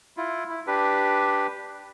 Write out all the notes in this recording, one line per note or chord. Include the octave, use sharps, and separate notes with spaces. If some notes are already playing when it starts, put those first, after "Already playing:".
E4 F4
E4
D4 G4 B4